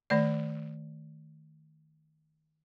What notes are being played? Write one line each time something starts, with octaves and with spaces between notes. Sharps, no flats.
D#3 A3 D5